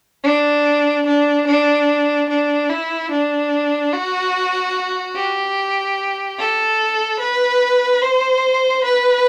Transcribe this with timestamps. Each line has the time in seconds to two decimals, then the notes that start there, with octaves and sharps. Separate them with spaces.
0.24 D4
1.06 D4
1.47 D4
2.30 D4
2.70 E4
3.11 D4
3.93 F#4
5.15 G4
6.39 A4
7.20 B4
8.02 C5
8.84 B4